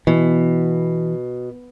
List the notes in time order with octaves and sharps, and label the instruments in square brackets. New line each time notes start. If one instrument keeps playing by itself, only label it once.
[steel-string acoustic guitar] B2 [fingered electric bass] E3